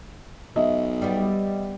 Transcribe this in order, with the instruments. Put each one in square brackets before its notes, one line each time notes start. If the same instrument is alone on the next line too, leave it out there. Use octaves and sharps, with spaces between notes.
[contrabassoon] B1 [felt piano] D#5 E5
[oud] G3 B3